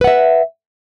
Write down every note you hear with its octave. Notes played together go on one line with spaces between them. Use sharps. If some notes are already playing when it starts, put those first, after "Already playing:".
B4 E5 F#5